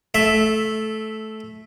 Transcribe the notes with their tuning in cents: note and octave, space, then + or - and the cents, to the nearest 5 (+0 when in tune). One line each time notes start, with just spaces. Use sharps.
A3 -15 E5 +0